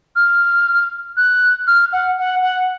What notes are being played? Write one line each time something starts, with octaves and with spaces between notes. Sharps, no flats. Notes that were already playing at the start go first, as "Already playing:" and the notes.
F6
F#6
F6
F#5
F#5
F#5